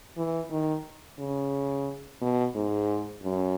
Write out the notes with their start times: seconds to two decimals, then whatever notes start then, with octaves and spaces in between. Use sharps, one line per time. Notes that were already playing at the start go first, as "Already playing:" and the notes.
0.17 E3
0.51 D#3
1.19 C#3
2.21 B2
2.55 G#2
3.23 F#2